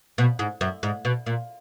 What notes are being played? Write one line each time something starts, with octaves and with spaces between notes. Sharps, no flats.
B2
G#2
F#2
G#2
B2
A#2